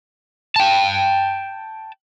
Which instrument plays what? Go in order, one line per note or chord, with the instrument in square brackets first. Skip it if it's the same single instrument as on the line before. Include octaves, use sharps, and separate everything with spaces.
[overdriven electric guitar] G5 A5